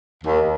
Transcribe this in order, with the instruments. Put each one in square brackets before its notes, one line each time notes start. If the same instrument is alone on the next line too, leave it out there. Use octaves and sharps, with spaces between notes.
[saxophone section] D#2